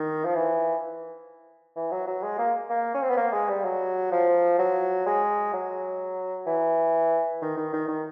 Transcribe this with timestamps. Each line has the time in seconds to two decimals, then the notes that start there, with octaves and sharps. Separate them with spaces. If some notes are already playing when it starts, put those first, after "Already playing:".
Already playing: D#3
0.25 F3
0.34 E3
1.76 E3
1.91 F#3
2.07 F#3
2.23 G#3
2.38 A#3
2.70 A#3
2.94 C#4
3.02 C4
3.10 B3
3.17 A#3
3.32 G#3
3.49 G3
3.64 F#3
4.12 F3
4.59 F#3
5.06 G#3
5.53 F#3
6.46 E3
7.42 D#3
7.57 D#3
7.73 D#3
7.88 D#3